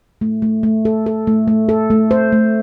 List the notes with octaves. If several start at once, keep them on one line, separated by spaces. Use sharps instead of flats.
A3
A3
A3
A4
A4
A3
A3
A4
A3
C5
A3